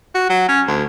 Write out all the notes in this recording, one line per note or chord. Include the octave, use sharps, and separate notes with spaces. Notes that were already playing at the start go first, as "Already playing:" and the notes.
F#4
F#3
C#4
D2